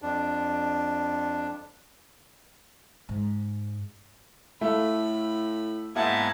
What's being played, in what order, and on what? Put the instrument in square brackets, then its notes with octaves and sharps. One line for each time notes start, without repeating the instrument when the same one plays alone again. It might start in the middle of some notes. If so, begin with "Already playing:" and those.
[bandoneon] F2 D4
[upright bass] G#2
[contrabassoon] A2 [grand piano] A3 F4 A4 [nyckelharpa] B5
[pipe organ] G#2 B3 G#6 [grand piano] A#3 E4 F#5 [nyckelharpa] A5